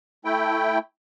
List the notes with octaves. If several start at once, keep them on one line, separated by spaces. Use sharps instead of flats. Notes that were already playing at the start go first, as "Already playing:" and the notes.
A3 E4 G5